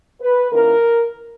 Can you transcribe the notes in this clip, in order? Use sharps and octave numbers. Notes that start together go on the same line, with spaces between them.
B4
D#3 A#3 C#4 E4 A#4